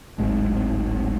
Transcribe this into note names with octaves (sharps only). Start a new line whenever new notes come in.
D1 G#1 G#3